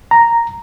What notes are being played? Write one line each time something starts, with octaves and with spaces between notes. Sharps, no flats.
A#5